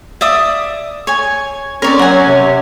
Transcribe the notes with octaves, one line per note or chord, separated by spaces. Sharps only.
D5 E5 D#6
C#5 G#5
C4 C#4 A#4 C#5 D5
F#3 F#5 G#5
C3